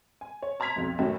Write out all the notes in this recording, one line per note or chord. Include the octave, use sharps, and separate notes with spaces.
G#5
C#5
A5 A#5 C6 G#6 B6 F7
B1 F2
F#2 A2 D#3 F#3